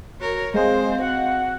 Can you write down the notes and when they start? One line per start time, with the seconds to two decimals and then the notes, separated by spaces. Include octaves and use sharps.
0.21 F#4 A#4 C#5
0.54 G#3 C4 C5 D#5 F5
1.01 F#4 F#5